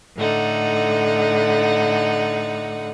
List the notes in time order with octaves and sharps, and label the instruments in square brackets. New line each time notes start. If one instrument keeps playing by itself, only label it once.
[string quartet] A2 D3 D#4 F#5